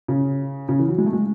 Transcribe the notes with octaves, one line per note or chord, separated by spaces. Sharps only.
C#3
C#3
E3
F#3
G#3
A3
G#3